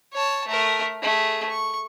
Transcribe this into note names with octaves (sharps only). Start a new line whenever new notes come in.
C#5 A5
A3 A#4
A3 G#4
C#6